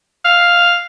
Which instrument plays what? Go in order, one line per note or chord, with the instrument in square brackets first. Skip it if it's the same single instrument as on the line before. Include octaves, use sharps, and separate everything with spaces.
[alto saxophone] F5